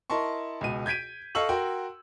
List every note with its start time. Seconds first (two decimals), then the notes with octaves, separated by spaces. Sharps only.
0.10 E4 A#4 D#5 A5 C6 C#6
0.61 C#2 B2 D#7
0.86 G6 G#6 B6 D7 D#7
1.35 A4 D#5 F5 C#6 E6 F#7
1.49 F#4 A#4 G5 C6